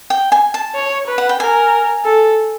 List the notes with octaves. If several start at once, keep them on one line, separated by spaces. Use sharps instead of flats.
G5
G#5
A5
C#5
B4
F#5
G5
A#4 G#5
A4